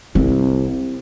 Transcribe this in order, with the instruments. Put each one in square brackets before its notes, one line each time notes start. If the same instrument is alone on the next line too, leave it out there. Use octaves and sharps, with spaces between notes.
[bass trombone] C2 [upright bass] C4